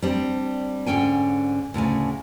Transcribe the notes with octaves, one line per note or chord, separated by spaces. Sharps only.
G3 C4 D4
G#2 D3 C#4 G5 G#5
D2 A2 C#3 G#5